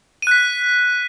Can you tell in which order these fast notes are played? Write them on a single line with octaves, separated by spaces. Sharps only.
D#7 F#6 B6